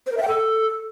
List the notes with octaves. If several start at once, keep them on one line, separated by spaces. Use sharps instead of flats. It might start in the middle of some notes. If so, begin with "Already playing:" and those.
C5
A#4
E5
G5
A4